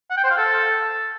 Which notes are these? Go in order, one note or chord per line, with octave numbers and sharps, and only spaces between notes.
F#5
G5
C5
F5
A4